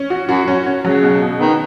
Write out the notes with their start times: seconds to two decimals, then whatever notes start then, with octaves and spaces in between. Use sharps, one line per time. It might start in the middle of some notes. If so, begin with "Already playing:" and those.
Already playing: C#4
0.10 F#4
0.29 F#2 F#4
0.48 C#4
0.67 C#4
0.84 C#3 F#3
1.03 B2
1.22 B2
1.40 D#3 B3